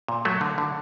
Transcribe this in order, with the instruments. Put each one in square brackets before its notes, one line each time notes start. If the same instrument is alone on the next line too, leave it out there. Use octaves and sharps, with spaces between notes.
[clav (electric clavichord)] A#2
F#3 A3
D3
D3